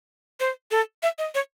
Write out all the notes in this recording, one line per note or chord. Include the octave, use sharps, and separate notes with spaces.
C5
A4
E5
D#5
C#5